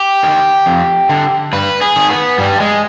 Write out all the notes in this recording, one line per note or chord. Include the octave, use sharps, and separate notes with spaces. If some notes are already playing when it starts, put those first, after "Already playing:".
Already playing: G4
D#3
F2
D3
G2 B4
G#4
D#3
B3
G2 G3
G#3